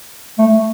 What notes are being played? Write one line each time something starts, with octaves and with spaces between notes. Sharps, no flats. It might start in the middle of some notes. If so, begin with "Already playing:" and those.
A3